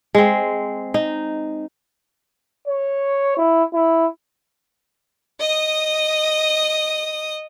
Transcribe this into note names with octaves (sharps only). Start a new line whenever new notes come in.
G#3 C4
D#4
C#5
E4
E4
D#5 D#6